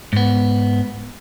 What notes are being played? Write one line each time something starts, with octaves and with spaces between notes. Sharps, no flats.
G#2 B3